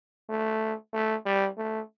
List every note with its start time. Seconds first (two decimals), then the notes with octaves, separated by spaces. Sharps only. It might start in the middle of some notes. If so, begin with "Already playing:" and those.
0.29 A3
0.93 A3
1.25 G3
1.58 A3